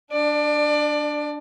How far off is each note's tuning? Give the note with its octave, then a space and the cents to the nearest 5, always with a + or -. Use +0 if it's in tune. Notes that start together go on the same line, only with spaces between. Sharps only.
D4 +0 D5 +25